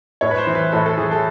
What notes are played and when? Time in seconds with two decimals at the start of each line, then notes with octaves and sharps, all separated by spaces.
0.21 A2 C#5
0.31 B4
0.38 C5
0.47 E3
0.55 B4
0.72 A2 A4
0.86 A4
0.97 E3 G#4
1.11 A4